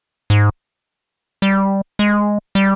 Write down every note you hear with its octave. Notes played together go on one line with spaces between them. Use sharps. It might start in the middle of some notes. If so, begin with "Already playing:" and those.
G#2
G3
G#3
G3